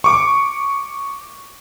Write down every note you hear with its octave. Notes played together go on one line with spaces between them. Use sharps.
C#6 D6